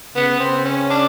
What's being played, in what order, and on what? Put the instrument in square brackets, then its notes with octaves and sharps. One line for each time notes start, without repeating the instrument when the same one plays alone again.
[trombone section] C#3 [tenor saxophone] B3
[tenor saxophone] C4
C#4
D4